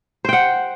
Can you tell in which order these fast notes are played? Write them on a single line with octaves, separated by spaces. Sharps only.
C5 G5 F#5